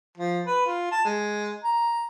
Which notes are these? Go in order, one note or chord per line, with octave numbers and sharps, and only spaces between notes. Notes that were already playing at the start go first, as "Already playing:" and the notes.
F3
B4
F4
A5
G#3
A#5